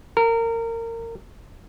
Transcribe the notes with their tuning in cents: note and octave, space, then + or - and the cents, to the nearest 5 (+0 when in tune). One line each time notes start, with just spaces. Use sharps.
A#4 -25